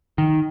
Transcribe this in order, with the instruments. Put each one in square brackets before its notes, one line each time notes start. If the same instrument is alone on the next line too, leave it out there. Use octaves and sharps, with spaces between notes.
[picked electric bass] D#3